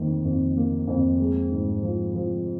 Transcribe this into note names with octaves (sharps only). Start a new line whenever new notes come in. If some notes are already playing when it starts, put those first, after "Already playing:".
Already playing: F2 D#3 A#3
F2
A#3
F2
G#3
G#2
F3
F3